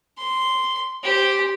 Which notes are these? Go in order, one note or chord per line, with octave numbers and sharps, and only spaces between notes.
C6
G4 C5